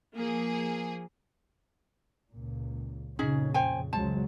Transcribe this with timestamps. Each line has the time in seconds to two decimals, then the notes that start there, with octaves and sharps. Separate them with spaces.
0.16 F3 A#3 G#4
2.32 C#2 A#2
3.19 F2 A#2 C#3 C#4 D#4 G#4
3.54 C5 G5 G#5
3.93 C#2 F#3 G#3 C5 A5